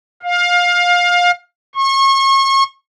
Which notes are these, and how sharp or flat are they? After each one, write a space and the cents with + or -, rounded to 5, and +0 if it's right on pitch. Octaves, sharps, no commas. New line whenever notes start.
F5 +20
C#6 -35